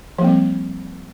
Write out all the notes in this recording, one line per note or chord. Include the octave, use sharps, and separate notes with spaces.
F3 G3 A#3 C4